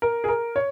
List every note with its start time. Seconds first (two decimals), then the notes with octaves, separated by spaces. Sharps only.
0.02 A#4
0.24 G#4
0.28 A#4
0.56 C#5